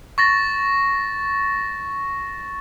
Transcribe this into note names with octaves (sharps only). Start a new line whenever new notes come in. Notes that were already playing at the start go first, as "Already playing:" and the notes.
C#6 A6 A#6